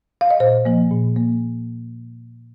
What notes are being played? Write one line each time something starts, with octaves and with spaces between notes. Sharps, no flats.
F5
D#5
A#2 C5
F3 A#3
A#2
A#3